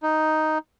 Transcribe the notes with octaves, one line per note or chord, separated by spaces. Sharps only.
D#4